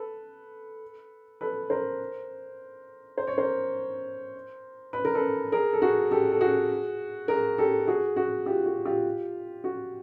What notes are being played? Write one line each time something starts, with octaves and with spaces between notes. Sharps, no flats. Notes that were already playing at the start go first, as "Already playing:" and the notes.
Already playing: A4 B4
A4 B4
A#4 C5
C5
C#5
A#4 C5
B4
A#4
A4 B4
G#4 A#4
A4
F#4 G#4
G4 A4
A4
F#4 G#4
G#4 A#4
G4 A4
F#4 G#4
F#4
F4 G4
F#4
F4 G4
F#4